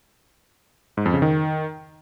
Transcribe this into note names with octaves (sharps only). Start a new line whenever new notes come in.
G#2
F2
C#3
D#3